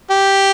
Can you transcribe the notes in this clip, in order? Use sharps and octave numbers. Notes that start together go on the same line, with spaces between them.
G4